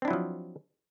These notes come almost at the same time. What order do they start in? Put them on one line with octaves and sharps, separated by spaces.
C4 D4 E4 F#3 F3